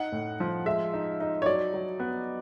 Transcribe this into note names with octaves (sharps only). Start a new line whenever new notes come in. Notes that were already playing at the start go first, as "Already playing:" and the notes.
Already playing: D#4 F#5
A2
F3
G#3 E5
D#4
D#4
C#5
F#3 D5
F#3
B3